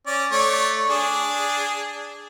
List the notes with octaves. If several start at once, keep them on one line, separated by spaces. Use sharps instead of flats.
C#4 D5
A3 C#5 D5
D4 G#4